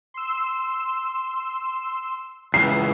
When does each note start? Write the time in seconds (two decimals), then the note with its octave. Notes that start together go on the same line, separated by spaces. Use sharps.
0.14 C6 E6
2.54 C#2 E3 C7